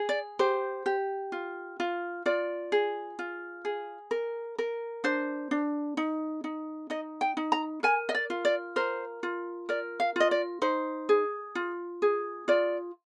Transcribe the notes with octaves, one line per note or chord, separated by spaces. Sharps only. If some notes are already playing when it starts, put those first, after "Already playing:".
Already playing: G#4
D5
G4 C5
G4
F4
F4
F4 D5
G#4
F4
G#4
A#4
A#4
D4 C5
D4
D#4
D#4
D#4 D#5
G5
D#4
A#5
A#4 G#5
D#5
D5
F4
D5
A#4 C5
F4
A#4 D5
F5
F4 D#5
D5
D#4 C5
G#4
F4
G#4
F4 D5